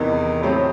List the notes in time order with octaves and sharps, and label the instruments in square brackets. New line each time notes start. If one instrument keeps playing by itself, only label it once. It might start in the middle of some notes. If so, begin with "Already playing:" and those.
Already playing: [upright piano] E2 C3 E3 [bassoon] D#3
[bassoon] A2 [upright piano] C3 F#3 C4 D#4 G4